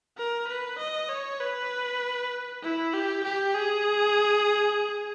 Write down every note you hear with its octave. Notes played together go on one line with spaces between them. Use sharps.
A#4
B4
D#5
C#5
B4
E4
G4
G4
G#4